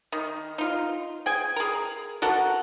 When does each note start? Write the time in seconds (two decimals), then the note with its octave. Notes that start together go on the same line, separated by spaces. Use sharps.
0.12 D#3
0.58 D#4 F4
1.26 G#4 G5 G#5
1.56 G#4 A#4
2.22 F#4 A4 A#4 F#5